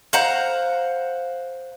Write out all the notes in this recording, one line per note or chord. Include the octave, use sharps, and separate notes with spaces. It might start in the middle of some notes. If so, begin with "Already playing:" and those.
C5 F5 F#5 A#5